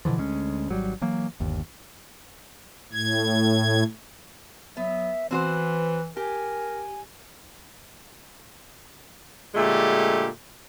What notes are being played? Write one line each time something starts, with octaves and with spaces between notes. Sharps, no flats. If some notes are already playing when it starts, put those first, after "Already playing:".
B2 D3 E3 F3
D2 G#3 C#4
G#1 F#3 G3
E3 F#3 A#3
G1 D#2
A2 G#6
F#3 B3 E5
E3 C4 F#4 B4 C5
G4 A#4 G#5
A#2 D3 G#3 A3 G4